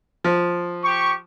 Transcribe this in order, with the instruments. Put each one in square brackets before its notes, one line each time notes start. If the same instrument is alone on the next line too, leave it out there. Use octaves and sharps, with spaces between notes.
[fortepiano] F3
[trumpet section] G4 C#6